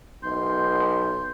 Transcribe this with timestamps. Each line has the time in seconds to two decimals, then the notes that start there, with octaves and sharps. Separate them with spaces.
0.23 B1 C6 G6